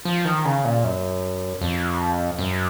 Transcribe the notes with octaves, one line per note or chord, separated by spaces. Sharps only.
F3
D#3
C#3
A#2
F#2
F2
F#2